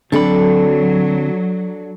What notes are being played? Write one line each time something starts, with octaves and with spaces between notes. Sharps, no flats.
D3 F#3 C4 D4 A4 B5